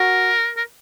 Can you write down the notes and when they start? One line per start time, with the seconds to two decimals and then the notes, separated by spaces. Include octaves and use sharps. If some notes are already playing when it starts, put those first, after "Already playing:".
Already playing: F#4 A#4
0.57 A#4